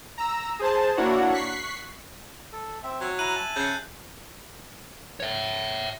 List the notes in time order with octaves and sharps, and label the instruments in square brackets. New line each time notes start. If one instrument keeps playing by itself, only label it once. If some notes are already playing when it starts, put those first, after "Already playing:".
[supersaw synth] A#5 E6
G#4 C5 A5
A#3 D4 E4 F#4 C#5 F#5
C#6 F#6 B6 C7
[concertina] A4
C4 E5
[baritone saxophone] F#3
[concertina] E4 A#5 [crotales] F#6 D#7 F#7
[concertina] E5 G#5 A5
[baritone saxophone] C#3 [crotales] G6 C7
[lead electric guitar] C#5 E5